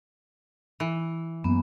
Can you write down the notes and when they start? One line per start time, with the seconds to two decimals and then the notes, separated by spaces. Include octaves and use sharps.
0.80 E3
1.44 F#2 A#3 B3